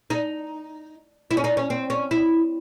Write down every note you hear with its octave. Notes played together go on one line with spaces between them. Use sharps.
D#4
E4
C#4
D#4
C#4
C4
C#4
E4